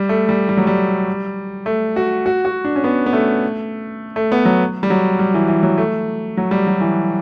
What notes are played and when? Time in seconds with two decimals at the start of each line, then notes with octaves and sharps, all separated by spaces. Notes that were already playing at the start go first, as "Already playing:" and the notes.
Already playing: G3
0.09 A3
0.29 G3
0.49 G3
0.57 F#3
0.67 G3
1.66 A3
1.96 F#4
2.26 F#4
2.45 F#4
2.65 D4
2.76 C#4
2.84 B3
3.06 B3
3.13 A3
4.16 A3
4.32 B3
4.45 F#3
4.83 G3
4.90 F#3
5.19 G3
5.34 E3
5.48 E3
5.63 F#3
5.78 A3
6.37 F#3
6.51 G3
6.67 F#3
6.81 E3